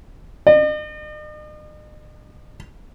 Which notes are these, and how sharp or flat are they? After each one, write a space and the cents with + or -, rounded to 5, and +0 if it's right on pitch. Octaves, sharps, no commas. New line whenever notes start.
D#5 -45